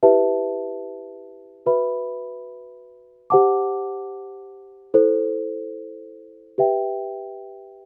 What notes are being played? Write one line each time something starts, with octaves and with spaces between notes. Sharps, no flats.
E4 G4 B4 E5 A5
F#4 B4 E5 B5
G4 C5 F#5 A5 D6
E4 A4 C5
G4 B4 E5 G5